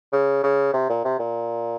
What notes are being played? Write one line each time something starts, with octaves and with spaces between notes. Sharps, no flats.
C#3
C#3
C3
A#2
C3
A#2